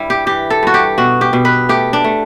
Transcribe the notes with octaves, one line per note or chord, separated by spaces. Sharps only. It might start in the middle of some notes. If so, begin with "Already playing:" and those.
Already playing: G2 G3 E4
G4
E3 G4
A4
G2 F#4
G4
B2 F#4
G4
B2
B4
A3 G4
D4
A3